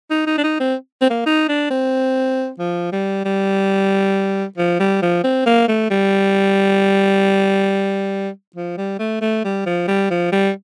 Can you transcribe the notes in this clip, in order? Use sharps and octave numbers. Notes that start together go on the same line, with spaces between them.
D#4
D#4
D4
D#4
C4
C4
A#3
D#4
D4
C4
F3
G3
G3
F3
G3
F3
C4
A#3
A3
G3
F3
G3
A3
A3
G3
F3
G3
F3
G3